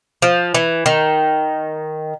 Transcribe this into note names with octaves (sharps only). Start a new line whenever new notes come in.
F3
E3
D#3